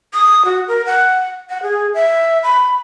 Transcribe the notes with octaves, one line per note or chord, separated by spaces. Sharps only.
D#6
F#4
A#4
F#5
F#5
G#4
E5
B5